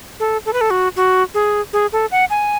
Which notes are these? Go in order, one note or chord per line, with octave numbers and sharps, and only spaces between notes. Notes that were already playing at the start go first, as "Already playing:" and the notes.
A4
A4
B4
A4
F#4
F#4
G#4
G#4
A4
F#5
G#5